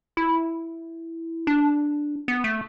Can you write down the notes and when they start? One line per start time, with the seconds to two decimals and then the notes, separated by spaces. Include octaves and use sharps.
0.17 E4
1.47 D4
2.28 B3
2.44 A3